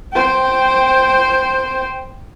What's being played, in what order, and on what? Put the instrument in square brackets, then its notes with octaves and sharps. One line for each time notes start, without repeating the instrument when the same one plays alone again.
[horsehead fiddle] C5 G5